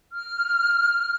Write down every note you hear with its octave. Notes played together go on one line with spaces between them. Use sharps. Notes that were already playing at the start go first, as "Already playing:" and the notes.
F6